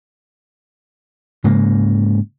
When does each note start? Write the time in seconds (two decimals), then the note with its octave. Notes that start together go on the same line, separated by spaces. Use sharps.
1.44 G#2 C#3 G#3 A#3